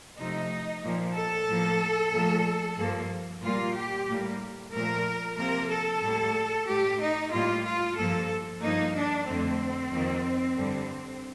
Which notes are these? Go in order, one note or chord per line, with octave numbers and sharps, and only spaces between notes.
C3 F3 A3 D#4
A#2 F3 A#3
A4
A2 F3 A#3
A#2 F3 A3
G2 F3 A#3
A#2 G3 A#3 F4
G4
A2 G3 A#3
A#2 F3 A3 A#4
C3 F3 A#3 A#4
A4
A2 G3 A#3
A2 A3 G4
D#4
A2 G3 A#3 F4
F4
G2 F3 A#3 A4
G2 F3 A#3 D#4
D4
F2 D3 A3 C4
F2 D#3 A#3
G2 D3 G3